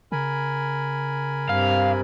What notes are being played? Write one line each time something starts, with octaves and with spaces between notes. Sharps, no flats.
C#3 A#4 G#5 B5
G2 C3 F5